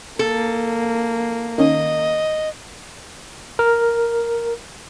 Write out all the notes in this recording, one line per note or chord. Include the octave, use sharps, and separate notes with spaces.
A#3 A4
D#3 C#4 D#5
A#4